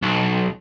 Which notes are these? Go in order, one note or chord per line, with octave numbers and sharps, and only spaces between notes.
B1